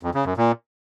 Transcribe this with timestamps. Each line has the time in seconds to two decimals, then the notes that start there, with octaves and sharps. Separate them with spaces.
0.03 F2
0.14 C#3
0.26 F#2
0.37 A#2